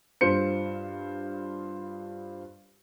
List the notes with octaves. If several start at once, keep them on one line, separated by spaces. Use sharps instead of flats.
G2 F4 C5 C#7